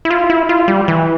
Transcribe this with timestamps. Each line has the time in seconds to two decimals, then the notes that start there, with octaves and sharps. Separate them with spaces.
0.05 E4
0.11 F4
0.30 E4
0.49 F4
0.68 G3
0.88 E3